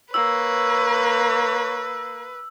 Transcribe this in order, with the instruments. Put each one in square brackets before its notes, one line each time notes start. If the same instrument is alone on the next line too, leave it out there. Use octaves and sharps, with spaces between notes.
[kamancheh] A#3 [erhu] B4 [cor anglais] C#5 [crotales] E6